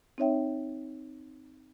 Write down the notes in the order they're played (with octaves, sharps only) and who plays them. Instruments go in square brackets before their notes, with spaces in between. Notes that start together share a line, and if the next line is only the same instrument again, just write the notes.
[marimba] C4 D#4 C#5 E5 G5